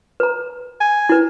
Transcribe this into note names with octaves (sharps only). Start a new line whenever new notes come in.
B4 A#5
G#5
E4 B4